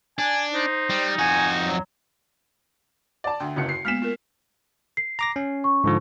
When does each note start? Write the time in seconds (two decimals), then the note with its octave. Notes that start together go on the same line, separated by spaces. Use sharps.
0.19 D4 G#5
0.53 D#4 C5
0.90 G3
1.19 F2 F#4 G#5
1.66 F#3
3.24 D5 A5
3.40 D2 G5
3.56 F#1 C#2 F#4 C#7
3.69 C7
3.85 G#3 A#3 B3 F6 B6 E7
4.02 F4 A#4
4.97 C7
5.19 A#5 D6 A#6
5.36 C#4
5.64 C#6
5.84 G#2 D3 F3